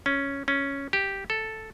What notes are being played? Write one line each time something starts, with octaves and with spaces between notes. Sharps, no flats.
C#4
C#4
G4
A4